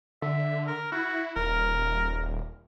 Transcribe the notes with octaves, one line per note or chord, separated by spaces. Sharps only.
D3 E5
A#4
E4 F#4
D#1 A#4